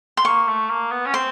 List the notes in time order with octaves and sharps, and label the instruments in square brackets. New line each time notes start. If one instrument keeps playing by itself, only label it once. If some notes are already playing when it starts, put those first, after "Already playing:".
[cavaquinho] C6
[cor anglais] A#3 [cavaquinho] C#6
[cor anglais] A3
A#3
B3
C#4
[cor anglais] C4 [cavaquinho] C6